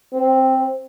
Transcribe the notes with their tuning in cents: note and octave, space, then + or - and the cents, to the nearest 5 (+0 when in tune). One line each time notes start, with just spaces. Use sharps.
C4 +5